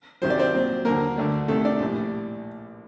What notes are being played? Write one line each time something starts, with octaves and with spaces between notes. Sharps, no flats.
C2 C3 D#3 F#3 C5
D5
C4 C5
A#2 F#3 C4
D#2 D3 F#3 A#3 A#4
D2 D3 A3 D4
C2 C3 D#3 A3 A4
D4 D5
A#1 A2 G3